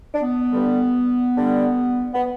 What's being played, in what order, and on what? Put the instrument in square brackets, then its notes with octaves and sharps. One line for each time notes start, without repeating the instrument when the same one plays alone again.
[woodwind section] D4
B3
G2 D3 G3
G2 D3 G3
B3